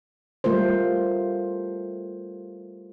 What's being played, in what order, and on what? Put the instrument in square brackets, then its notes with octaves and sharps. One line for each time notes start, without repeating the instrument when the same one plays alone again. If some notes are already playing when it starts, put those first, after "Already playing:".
[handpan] G3 A3 F4 A#4 C5